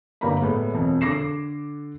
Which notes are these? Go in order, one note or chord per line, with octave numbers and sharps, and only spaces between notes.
G1 G2 A#3 D5 A#5 B5
A2 G#3 B3
E1 F2
D3 D6 A#6 C7 E7